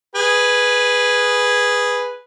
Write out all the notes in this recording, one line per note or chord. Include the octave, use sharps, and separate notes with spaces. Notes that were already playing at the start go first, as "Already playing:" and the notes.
G#4 B4